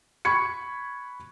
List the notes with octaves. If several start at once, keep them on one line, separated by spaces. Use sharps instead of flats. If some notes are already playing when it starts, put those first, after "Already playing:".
B5 C#6 G#6 C#7